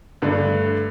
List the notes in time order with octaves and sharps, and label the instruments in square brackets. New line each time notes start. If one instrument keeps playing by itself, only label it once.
[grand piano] G2 D3 A3 D4